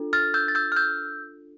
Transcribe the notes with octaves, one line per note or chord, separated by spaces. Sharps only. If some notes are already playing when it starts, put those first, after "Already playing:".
Already playing: D4 F4 A4
F6 A6
E6 G6
A6
E6 G6
F6
E6 G6